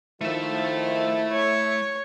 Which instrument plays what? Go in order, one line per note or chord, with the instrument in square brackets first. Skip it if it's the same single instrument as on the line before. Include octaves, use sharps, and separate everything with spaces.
[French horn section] D#3 F3 [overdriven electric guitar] A3 E5 [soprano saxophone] E4
[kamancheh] C#5